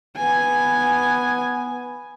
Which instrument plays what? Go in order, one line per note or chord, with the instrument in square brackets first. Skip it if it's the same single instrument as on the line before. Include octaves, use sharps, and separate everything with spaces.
[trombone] B3 [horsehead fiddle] G#5